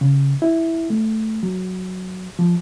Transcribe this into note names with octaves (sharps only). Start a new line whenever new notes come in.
C#3
E4
A3
F#3
F3